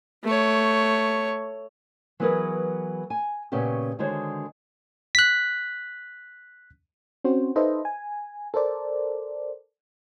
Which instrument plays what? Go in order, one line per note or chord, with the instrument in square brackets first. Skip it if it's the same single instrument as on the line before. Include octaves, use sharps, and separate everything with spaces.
[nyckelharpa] A3 C#5
[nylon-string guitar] E3 F#3 B3 G#4 A#4 B4
G#5
A#2 C#3 B3 C#4 G4
D3 D#3 G#3 F#4 C5 C#5
[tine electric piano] F#6 B6
[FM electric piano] C4 C#4 F#4 C5
D#4 A4 B4 C5 D#5 E5
G#5
A4 A#4 C5 D5